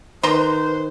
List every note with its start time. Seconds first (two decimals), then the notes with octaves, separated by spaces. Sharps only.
0.23 D#3 B4 C5 A#5 C6